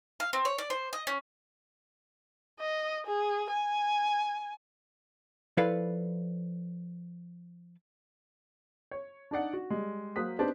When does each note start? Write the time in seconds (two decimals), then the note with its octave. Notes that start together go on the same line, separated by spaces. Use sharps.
0.20 F5
0.33 C4
0.45 C#5
0.58 D5
0.70 C5
0.93 D#5
1.07 C#4
2.60 D#5
3.07 G#4
3.51 G#5
5.57 F3 E4 A4 B4 D5 F5
8.91 C#5
9.31 D4 D#4 D5 F#5
9.53 F#4
9.70 G3 G#3
10.16 F#3 A#3 C5 D#6 F#6 B6
10.39 B3 C4 D4 D#4 G4 C5